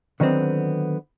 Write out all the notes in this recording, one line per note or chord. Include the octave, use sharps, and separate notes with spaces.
D3 D#3 F#3 B3 C4